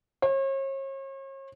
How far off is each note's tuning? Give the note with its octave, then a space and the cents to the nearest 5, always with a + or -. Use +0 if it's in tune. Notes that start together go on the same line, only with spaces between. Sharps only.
C#5 -40